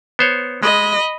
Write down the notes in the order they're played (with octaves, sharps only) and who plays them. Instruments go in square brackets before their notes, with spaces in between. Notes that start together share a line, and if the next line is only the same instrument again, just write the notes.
[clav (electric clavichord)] B3 C5 C#5
[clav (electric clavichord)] G#3 [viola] D#5 B5